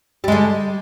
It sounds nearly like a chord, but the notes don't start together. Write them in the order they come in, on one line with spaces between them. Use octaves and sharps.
G3 G#3 D3